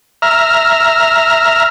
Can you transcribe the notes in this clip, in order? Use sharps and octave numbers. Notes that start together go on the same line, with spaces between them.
E5 A#5 F6